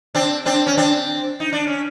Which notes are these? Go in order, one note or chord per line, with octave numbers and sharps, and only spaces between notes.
C4 D4
C4 D4
C#4
C4 D4
D#4
D4
C#4